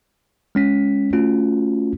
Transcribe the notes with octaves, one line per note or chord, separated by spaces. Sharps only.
G#3 C#4 B6
A3 C#4 F4 F#4